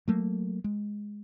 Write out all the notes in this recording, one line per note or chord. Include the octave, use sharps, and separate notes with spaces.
F#3 A3 A#3
G#3